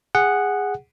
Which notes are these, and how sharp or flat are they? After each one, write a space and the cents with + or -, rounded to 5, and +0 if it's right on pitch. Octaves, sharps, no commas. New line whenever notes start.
G#4 -15 F#5 +0